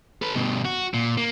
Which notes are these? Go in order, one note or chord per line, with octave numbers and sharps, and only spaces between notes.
A4 B4
G2 B2
F#4
A#2
A#3